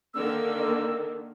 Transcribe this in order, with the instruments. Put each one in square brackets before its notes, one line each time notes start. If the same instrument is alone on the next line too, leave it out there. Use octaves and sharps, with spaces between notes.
[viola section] D3 D#3 A#3 [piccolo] E6